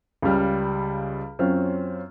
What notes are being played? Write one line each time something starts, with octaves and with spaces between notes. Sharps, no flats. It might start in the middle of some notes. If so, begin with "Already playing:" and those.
C#2 C#3 G3 F6
F#2 C4 C#4 F4 F6